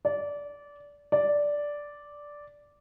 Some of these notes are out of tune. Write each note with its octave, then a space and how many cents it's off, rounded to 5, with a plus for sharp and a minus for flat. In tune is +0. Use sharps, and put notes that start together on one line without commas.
D5 -20
D5 -5